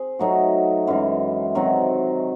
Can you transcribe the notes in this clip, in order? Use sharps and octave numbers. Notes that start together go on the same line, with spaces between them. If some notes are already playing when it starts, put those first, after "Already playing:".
Already playing: C4 G#4
F#3 A3 D#4 F#4
F#2 E3 G#3
C3 D#3 F#3 C4